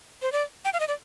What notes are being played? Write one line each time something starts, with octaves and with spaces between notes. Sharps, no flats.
C5
D5
G5
F5
D#5
D5